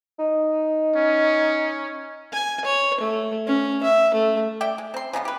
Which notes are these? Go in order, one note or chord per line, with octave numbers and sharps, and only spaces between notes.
D#4
C#4
G#5
C#5
A3
C#4
E5
A3
D5 E5 G5
G#3
C4 C6
C#3 G#3 A#3 B3
G4 B4